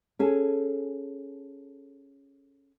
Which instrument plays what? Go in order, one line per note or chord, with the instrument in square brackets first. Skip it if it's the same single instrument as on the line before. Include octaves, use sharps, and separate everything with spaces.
[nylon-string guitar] C#4 G#4 A4